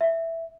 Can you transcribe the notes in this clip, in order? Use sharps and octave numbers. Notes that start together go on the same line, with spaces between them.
E5